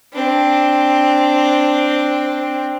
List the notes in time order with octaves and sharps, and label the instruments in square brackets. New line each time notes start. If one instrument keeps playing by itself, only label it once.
[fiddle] C4 D4